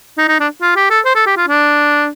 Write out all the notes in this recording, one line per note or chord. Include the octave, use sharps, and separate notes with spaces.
D#4
D#4
D4
F4
G4
A4
C5
A4
G4
F4
D4